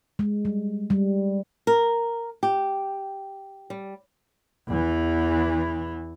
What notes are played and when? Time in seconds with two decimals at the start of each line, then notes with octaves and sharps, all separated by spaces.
0.19 G#3
0.45 G3
0.90 G3
1.67 A#4
2.43 G4
3.70 G3
4.68 E2 E3